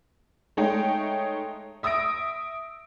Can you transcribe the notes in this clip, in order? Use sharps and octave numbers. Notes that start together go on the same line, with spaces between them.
G#3 A3 D#4 C#5 G5
E5 D#6 E6 A#6 D7